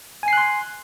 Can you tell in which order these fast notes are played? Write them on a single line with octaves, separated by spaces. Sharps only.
G#5 C7 F#6 C6